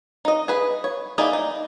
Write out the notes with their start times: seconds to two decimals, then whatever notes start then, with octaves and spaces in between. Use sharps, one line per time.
0.25 D#4 D#5
0.48 G#4 B4
0.84 C#5
1.18 A#3 D#4 E4 G#4 D5
1.33 D#4